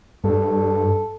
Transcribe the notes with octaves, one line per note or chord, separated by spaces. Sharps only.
G2 A4